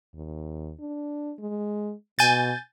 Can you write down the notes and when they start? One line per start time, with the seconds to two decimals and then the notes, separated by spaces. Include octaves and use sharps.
0.15 D#2
0.80 D4
1.39 G#3
2.19 B2 G#5 G6 A6